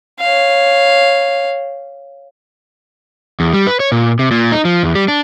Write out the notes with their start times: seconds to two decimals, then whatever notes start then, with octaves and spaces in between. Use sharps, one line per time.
0.21 C#5 F5
3.40 E2
3.53 G3
3.67 B4
3.80 C#5
3.92 A#2
4.19 C3
4.31 A#2
4.52 D#4
4.65 F3
4.83 E2
4.95 G3
5.08 D4